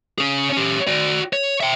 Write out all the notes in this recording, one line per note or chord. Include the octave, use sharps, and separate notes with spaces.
C#4 G#4
C#4 G4
F#4 D5
C#5
E5 G5